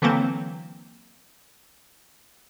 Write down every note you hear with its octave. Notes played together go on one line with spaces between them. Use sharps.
D3 E3 F#3 A#3 C4